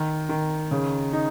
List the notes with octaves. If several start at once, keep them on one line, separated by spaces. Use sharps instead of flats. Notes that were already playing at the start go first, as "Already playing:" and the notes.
Already playing: D#3
D#3
C#3
D#4